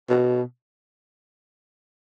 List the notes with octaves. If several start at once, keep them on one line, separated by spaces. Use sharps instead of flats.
B2